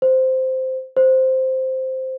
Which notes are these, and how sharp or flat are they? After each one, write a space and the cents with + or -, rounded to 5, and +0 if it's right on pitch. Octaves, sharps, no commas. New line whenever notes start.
C5 -10
C5 -5